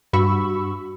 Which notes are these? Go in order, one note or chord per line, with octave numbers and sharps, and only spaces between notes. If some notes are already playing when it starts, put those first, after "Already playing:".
G2 F#4 B5 C#6 E6